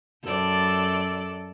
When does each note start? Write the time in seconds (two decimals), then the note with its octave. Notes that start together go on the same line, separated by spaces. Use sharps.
0.23 F#2 A4 D5